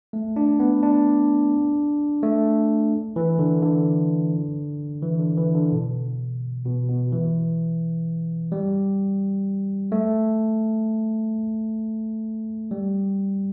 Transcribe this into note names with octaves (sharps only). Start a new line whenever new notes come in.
A3
D4
B3
D4
A3
E3
D3
D3
E3
D3
E3
D3
B2
B2
B2
E3
G3
A3
G3